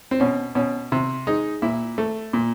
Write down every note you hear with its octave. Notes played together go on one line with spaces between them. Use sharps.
C4
B2 C#4
B2 C#4
C3
G#3 D#4
A#2 E4
A3
A#2